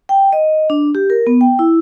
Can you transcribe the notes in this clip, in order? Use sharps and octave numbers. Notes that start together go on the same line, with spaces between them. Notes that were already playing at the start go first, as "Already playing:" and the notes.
G5
D#5
D4
G4
A#4
B3
G5
E4